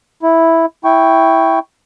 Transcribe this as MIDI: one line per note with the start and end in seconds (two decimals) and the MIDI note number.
0.23 0.66 64
0.84 1.59 64
0.84 1.59 79
0.84 1.59 85